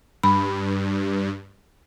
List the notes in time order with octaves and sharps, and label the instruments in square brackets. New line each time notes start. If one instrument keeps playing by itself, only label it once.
[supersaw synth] G2 [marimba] B5